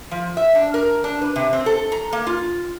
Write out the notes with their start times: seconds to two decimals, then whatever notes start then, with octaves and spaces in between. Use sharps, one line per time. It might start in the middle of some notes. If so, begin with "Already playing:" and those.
0.11 F3
0.37 E5
0.55 D4
0.74 A#4
1.04 D4
1.21 B4
1.36 C3
1.53 C4
1.66 A4
1.92 A#5
2.13 A#3
2.27 F4